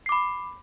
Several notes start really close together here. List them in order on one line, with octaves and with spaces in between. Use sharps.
C7 D6 B5